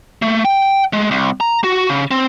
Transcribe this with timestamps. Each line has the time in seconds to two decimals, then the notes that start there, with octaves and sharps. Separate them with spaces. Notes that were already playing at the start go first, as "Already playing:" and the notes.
0.22 A3
0.45 G5
0.93 G#3
1.11 C2
1.40 A#5
1.64 F#4
1.89 C#3
2.11 C4